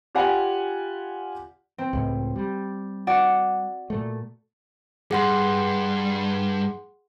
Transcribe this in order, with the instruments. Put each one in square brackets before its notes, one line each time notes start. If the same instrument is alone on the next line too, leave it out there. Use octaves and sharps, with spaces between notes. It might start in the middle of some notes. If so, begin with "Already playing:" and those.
[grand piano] F4 G4 D5 F#5 G#5 B5
[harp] C4
[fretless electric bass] C#2 A2
G3
[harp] F#4 D5 F#5
[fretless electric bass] A#2 A3
[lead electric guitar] G2 [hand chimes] G#4 F#5 C6